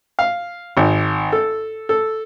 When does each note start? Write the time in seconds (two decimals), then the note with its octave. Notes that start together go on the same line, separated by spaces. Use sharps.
0.19 F5
0.77 G#1
1.33 A4
1.89 A4